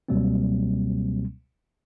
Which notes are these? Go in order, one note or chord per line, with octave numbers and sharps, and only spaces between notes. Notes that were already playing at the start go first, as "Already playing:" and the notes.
C#2 B2 F#3 G3 A#3 C4